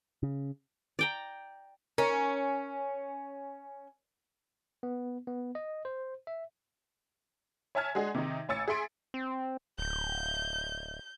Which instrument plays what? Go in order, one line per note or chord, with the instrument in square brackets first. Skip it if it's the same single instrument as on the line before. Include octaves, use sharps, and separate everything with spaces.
[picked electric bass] C#3
[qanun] D5 G5 A#5
[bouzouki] C#4 [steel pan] A#4
[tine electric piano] B3
B3
D#5
C5
E5
[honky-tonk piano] C#5 E5 G#5 A5 F6 G#6
G#3 D4 F#4 G#4
C3 D#3 D#4
A1 C#5 G#5 E6 A6 C#7
G#4 E5 C6 D7
[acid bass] C4
[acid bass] D1 [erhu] G6